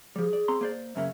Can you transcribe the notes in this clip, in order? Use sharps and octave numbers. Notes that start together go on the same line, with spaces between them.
F3 G3 G#4
D5
C4 A#5 C6
A#3 C5 D5
F#2 C#3 A#3 E5